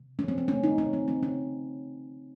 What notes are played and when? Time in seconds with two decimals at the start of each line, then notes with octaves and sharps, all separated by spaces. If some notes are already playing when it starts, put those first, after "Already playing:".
Already playing: C3
0.19 F3 C#4
0.28 C4
0.38 C#4
0.48 A3 C#4
0.64 D#4
0.78 C#3 C#4
0.93 C4
1.08 C#3 C4
1.23 C#4